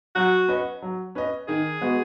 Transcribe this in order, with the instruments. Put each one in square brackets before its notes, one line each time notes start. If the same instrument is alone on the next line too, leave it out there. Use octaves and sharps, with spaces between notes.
[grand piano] F#3 [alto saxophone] F#4
[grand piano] C#4 B4 D#5
F#3
C#4 B4 D#5
[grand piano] D#3 [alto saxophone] G#4
[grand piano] G#3 B3 F#4